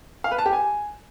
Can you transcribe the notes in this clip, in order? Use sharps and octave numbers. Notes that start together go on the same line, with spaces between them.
F5
B4
A5
G4
G#5